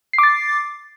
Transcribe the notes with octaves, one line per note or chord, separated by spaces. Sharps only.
D6 A6 C7